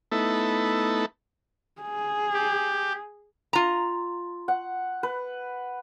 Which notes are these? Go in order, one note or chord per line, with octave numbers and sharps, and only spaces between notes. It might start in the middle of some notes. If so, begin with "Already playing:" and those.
A3 B3 D#4 E4 A4
G#4
G4
F4 A#5
F#5
B4